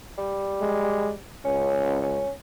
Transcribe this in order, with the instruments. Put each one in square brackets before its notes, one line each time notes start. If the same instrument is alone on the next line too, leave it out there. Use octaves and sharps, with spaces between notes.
[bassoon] G3
[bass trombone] G#3
[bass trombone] C#2 [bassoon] C#4
[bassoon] C#4